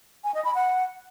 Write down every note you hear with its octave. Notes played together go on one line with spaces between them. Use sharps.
G#5
D#5
B5
F#5